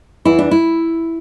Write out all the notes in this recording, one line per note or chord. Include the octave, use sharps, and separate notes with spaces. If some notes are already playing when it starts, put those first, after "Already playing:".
E2 E3 E4
D4
E4